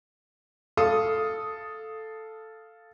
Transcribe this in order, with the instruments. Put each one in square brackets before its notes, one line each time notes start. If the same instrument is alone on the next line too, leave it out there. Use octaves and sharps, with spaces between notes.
[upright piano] A4 F5 D#6